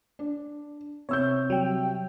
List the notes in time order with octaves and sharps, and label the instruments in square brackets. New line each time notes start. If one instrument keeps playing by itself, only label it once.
[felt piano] D4
[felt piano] C3 E6 G6 [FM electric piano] C#5
[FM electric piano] F#3 G3 G5